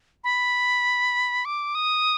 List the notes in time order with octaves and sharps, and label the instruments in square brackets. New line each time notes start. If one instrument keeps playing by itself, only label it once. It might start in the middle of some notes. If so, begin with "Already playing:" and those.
[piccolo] B5
D6
D#6